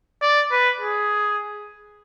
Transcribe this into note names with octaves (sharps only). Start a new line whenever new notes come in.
D5
B4
G#4